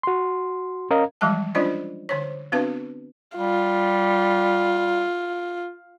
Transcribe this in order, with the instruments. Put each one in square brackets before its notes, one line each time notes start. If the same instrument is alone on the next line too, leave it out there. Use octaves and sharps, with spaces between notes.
[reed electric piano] F#4 C6
C#4 A#4 D#5 F5 A#5
[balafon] E3 F3 G3 G#3 F5 A5
C#4 D4 F4 C5 D5 D#5
D3 C5 C#5
B3 C4 D4 F#4 B4 F5
[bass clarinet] G3 [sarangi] F4